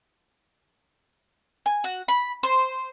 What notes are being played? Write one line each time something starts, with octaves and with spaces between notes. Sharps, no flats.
G#5
F#4
B5
C5